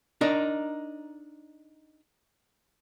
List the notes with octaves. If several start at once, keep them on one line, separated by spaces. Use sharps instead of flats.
D4 D#4 A#4